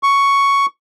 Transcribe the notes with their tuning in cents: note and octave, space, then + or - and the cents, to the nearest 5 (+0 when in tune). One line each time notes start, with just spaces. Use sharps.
C#6 +5